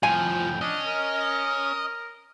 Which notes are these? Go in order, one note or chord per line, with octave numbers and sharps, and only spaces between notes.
F2 A2 F3 G5 G#5
C#4 D4 D#5
A#4
A#4